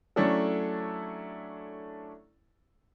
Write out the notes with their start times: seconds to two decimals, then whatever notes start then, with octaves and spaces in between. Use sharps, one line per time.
0.16 F#3 A3 C#4 D4 E4 A4